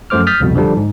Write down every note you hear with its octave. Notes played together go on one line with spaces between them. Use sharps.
F#2 F3 A3 C5 D6 F6
D#6 F6 G6 A6 B6
C2 F2 B2
D3 F3 G3 D4
G#2